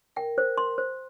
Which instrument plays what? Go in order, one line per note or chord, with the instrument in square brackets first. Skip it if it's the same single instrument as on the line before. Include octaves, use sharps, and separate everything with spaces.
[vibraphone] A#4 [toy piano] G5
[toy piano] C5
C6
C5